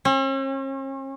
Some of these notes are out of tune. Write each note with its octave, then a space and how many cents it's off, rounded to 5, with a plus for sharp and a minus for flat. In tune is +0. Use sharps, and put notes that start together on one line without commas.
C#4 -45